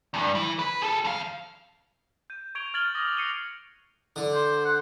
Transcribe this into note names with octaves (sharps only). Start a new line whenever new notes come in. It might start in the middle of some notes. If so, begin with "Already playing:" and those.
E2 G2
E3
B4
G#4 A4
F2 F5
G6 D#7
C#6 G#6 D7 F7 G7
F6 G#6 A6 F#7 G7
D6 D#6 F6 A6 A#6 F#7
F#6 C7 C#7 D#7 F7 G7
D3
C5
F#5